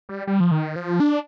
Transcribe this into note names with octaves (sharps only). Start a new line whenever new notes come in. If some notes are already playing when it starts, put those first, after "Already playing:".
G3
G3
F3
D#3
F3
D4